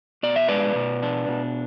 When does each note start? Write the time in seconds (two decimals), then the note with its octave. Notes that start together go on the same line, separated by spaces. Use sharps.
0.23 B2 D5
0.36 E5
0.48 G#3 B4 D5
0.75 B2
1.03 D4
1.29 B2